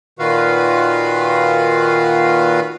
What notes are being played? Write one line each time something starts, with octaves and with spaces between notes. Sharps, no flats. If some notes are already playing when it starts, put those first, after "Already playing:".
A#2 D#3 F4 F#4 B4 F5